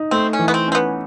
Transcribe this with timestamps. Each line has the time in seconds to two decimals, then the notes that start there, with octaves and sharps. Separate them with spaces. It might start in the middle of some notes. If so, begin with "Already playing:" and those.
Already playing: D#4
0.11 A3 C4
0.33 C#4
0.39 E3
0.48 B3
0.54 C4
0.68 C4 C#4
0.75 B3